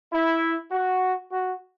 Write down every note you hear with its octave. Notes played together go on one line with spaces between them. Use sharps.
E4
F#4
F#4